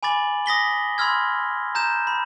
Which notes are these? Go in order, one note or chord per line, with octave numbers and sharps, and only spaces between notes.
G#5 B5 D6 A6 F#7
D#6 A#6 B6 G7
B5 C6 E6 F6 G#6
A#5 G6 E7
B5